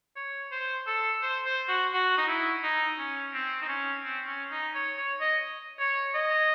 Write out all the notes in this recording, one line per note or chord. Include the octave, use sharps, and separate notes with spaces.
C#5
C5
A4
C5
C5
F#4
F#4
D#4
E4
D#4
C#4
C4
D#4
C#4
C4
C#4
D#4
C#5
C#5
D#5
C#5
D#5